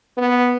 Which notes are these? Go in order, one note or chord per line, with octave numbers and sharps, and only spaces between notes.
B3